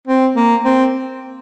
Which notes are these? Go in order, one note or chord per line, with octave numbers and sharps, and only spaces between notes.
C4
A#3
C4